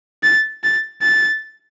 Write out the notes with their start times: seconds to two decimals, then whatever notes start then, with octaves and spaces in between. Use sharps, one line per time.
0.23 A6
0.64 A6
1.02 A6